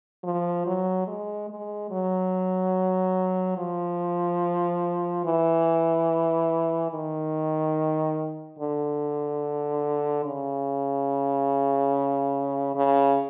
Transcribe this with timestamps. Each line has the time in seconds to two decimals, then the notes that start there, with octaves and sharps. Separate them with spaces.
0.24 F3
0.66 F#3
1.07 G#3
1.49 G#3
1.91 F#3
3.58 F3
5.25 E3
6.92 D#3
8.59 D3
10.25 C#3
12.75 C#3